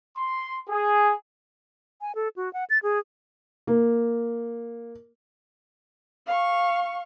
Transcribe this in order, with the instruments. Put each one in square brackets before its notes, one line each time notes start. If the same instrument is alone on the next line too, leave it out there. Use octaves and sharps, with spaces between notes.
[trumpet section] C6
G#4
[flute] G#5
A4
F#4
F#5
A6
G#4
[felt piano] A#3
[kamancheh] F5 C#6